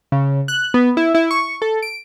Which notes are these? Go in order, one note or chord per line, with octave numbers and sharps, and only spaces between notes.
C#3
F#6
B3
E4
E4
C#6
A4
D7